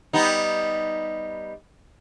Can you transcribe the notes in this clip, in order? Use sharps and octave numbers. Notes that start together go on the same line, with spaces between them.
G3 B3 D#4